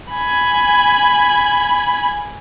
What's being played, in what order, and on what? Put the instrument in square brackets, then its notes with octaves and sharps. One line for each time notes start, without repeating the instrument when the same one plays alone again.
[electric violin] G#5 B5